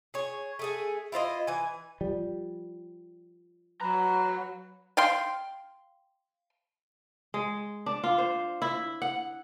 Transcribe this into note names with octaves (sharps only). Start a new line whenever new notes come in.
G#4 C#5
A3 G#4 G#5
E4 F4 C5 D#5
E3 G#5
F3 G3
F#3 B4 F#5 A#5
F5 G5 C6
G#3
D4
F4
C5
E4
F#5